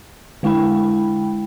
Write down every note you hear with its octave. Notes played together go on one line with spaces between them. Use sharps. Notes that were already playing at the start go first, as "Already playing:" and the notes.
D3 G#3 E4 G5 B5